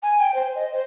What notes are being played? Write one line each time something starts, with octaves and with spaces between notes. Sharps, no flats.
G#5
G5
C5
D#5
C5